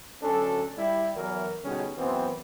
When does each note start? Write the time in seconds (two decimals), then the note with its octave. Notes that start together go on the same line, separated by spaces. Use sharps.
0.21 D2 F#3 C#4 D4 A4
0.77 G3 E4
1.14 E2 E3 F#3 E4 A#4
1.64 B2 D3 G3 C#4 D#4 G#4
1.96 F#2 E3 B3 C4